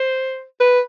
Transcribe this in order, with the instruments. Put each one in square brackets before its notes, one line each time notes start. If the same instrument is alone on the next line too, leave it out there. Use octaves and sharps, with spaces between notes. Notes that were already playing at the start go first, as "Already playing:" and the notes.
Already playing: [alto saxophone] C5
B4